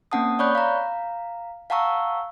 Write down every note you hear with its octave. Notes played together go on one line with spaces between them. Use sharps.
A#3 C4 C#4 F#5 A5 D#6
C#5 D5 B5 C#6 F#6 G6
F5 A#5
F5 F#5 A5 A#5 C#6 E6